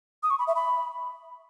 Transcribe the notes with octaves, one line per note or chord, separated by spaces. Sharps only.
D#6
C#6
B5
E5
B5